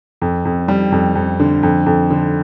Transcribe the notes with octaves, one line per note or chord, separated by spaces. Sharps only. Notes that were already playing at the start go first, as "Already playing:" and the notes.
F2
F2
G3
F2
F2
D3
F2
F2
D3